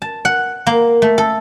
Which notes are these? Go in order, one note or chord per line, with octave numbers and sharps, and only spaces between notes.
A5
F#5
A#3
A3
A4